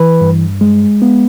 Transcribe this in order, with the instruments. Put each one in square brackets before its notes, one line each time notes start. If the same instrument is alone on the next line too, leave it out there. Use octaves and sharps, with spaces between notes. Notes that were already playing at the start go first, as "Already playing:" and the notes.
Already playing: [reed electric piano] E3 B4
G2
G#3
B3